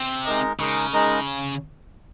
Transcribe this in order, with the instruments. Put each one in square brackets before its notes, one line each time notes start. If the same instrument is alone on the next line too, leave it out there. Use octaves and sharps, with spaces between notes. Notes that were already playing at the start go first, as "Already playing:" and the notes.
Already playing: [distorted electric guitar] C3
[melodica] G#3 D#4 A#4 D#5
[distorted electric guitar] C#3 [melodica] G#3 D#4 A#4 D#5
[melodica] G#3 D#4 A#4 D#5